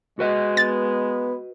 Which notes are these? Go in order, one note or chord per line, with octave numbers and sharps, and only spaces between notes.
G#3 F#4 B4 D#5
B3 A6